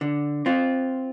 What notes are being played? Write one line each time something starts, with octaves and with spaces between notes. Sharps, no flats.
D3
C4 F4